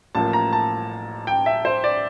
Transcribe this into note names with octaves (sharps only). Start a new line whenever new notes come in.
A1 A2 F3 A#3 A5
A#5
A5
G5
E5
C5
D5